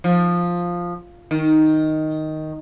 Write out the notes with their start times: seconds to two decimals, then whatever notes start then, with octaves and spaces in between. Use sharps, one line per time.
0.04 F3
1.31 D#3